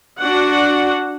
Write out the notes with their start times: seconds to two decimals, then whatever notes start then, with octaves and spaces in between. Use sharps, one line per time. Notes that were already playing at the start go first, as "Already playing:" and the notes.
0.21 D4 F#4 F#5